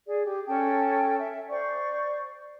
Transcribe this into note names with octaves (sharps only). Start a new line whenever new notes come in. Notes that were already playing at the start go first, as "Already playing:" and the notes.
G#4 D5
G4
C#4 A4 G5 A5
E5
C5 D5 C#6